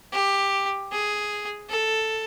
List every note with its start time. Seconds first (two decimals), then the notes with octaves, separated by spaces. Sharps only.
0.12 G4
0.92 G#4
1.69 A4